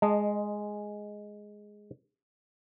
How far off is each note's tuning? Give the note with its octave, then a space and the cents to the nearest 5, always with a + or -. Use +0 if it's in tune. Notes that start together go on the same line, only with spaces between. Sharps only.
G#3 +0 D#5 -15 A5 +5